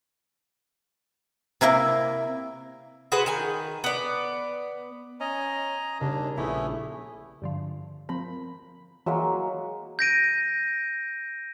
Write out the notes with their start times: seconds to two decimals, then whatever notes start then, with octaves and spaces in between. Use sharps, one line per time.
1.61 C3 A#3 E4 A#4
3.12 F#4 G#4 B4 C5
3.26 D#3 G#5
3.84 B3 D5
5.20 C#4 D#5 G#5 A#5
6.01 D#2 C#3 G3 D4
6.37 A#1 A3 B3 C#4 E4 G4 D#6
7.42 G2 D3 F3
8.09 F3 C4 A#4 B5
9.06 E3 F#3 G#3 A#3
9.99 G6 A#6 D7 D#7